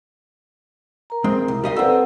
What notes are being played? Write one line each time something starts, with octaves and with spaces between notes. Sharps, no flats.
A#4 A#5
G#3 C4
C2
G3 D#5 F5
C4 A4 B4 D5 F#5